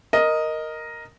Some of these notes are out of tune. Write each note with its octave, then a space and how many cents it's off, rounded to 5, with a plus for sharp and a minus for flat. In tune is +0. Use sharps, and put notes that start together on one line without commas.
A#4 +0 D#5 +0